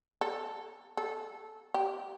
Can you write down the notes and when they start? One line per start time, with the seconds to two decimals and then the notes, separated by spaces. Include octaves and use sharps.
0.21 A4
0.97 A4
1.74 G4